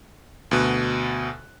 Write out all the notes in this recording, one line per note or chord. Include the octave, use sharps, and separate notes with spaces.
D2 B2 F#6